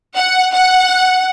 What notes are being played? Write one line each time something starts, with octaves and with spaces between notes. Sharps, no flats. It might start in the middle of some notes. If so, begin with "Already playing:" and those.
F#5
F#5